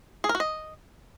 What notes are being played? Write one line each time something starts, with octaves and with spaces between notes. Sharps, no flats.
G#4
A#4
F#4
D#5